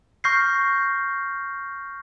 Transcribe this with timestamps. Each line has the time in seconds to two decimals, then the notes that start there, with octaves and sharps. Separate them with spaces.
0.24 C#6 F6 G6 A#6 C7